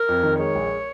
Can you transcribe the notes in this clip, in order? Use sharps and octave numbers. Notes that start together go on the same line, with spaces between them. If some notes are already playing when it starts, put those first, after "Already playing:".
Already playing: A#4
F2
D#3
G#3 C#5
A#1